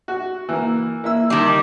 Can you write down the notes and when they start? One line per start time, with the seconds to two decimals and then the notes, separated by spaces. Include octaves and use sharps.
0.08 F#4
0.49 E3 A#3
1.04 A#3 E4 E6
1.30 D#3 G3